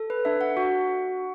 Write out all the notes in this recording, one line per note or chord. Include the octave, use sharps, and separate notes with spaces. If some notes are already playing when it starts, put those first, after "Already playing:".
Already playing: A4
B4
D4 E5
F#5
F#4